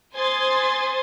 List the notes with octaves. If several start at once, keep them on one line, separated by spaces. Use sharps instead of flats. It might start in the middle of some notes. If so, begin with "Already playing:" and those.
C5 G#5 C6 D#6 G#6 A6